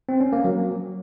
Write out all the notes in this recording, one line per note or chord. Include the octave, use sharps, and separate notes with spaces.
C4
C#4
A#3
F#3